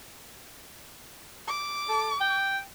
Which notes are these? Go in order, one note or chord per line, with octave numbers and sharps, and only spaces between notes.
D6
A4
G5